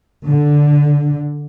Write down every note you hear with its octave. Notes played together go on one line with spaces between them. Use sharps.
D3